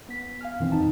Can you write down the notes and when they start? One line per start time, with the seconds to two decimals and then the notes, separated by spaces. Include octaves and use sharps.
0.09 B3 B6
0.41 F5 G#5 F6
0.60 F#2 B2 D#3 E3 C4
0.72 F2 D#4 A5